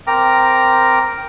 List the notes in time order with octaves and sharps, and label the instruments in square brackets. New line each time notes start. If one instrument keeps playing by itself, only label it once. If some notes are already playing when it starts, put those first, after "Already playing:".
[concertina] C4 A#4 A#5 D6